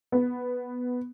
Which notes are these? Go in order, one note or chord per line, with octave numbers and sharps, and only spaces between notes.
B3